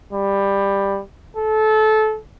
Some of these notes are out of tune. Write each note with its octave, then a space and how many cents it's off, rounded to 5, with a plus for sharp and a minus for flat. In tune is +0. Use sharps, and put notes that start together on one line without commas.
G3 +15
A4 -20